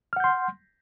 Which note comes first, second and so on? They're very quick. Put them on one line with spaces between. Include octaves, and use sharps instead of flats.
F6 F#5 G6 C6